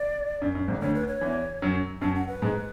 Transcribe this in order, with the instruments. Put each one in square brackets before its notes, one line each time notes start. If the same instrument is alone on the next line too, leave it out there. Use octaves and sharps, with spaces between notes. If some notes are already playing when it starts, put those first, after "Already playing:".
Already playing: [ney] D5
[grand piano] F#2
F#2
G#1 G#2
[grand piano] D2 D3 [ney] C#5
[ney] B4
C#5
[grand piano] E2 E3
F#2 F#3
[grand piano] F#2 F#3 [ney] A5
[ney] F#5
B4
[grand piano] G#2 G#3